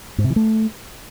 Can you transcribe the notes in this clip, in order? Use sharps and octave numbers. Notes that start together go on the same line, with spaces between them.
G#2
C3
E3
A3